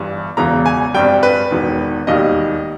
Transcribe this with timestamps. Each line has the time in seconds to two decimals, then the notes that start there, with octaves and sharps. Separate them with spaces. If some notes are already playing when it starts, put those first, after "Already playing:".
Already playing: G1 G2 E3
0.37 E1 E2 C#3 E3 A#5
0.66 G#5
0.94 G#1 G2 G3 G5
1.23 B4
1.51 E1 E2 D#3
2.07 E1 D#2 D#3 G3 D#5